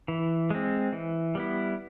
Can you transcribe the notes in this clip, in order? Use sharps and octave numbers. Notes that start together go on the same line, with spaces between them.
E3
G#3 C4
E3
G3 B3 E4